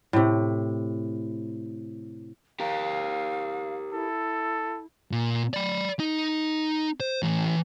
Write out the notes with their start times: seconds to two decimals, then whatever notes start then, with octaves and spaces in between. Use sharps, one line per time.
0.13 A2 C3
2.60 G4 A#4 F5
3.93 E4 A4
5.12 A#2
5.54 D5 B5
5.99 D#4 D#5
7.00 C5
7.23 A2 E3